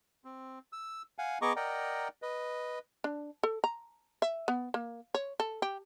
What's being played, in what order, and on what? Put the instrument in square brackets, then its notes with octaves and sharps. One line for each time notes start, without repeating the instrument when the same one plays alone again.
[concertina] C4
E6
F5 F#5 G#5
B3 G#4 D#5 A#5 C#6 D6
A#4 D5 D#5 F#5 G5 A#5
B4 D#5
[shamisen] D4
A4
A#5
E5
B3
A#3
C#5
A4
G4